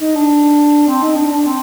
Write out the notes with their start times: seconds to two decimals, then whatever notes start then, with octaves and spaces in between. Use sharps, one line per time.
0.01 D#4
0.16 D4
0.87 C4
1.02 D#4
1.16 D4
1.31 D4
1.46 C4